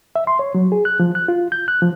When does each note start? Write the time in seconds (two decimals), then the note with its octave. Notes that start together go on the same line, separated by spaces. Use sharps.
0.16 E5
0.27 C6
0.39 C#5
0.55 F#3
0.72 G#4
0.85 F#6
1.00 F3
1.15 F#6
1.28 F4
1.52 G6
1.68 F#6
1.82 F3